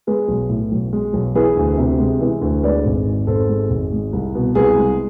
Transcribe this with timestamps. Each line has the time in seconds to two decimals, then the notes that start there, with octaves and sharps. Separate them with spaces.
0.07 G#3 G#4 B4
0.28 B1
0.49 A2
0.71 B1
0.93 G#3
1.13 B1
1.35 E3 G#4 B4
1.57 D2
1.78 C3
1.99 G#3
2.21 E3
2.42 D2
2.63 G#3 B4 D5
2.85 G#1
3.06 G#2
3.27 G#1 A4 C5
3.49 G#3
3.70 G#1
3.92 G#3
4.13 C2
4.35 B2
4.55 C2 G#4 B4
4.77 G#3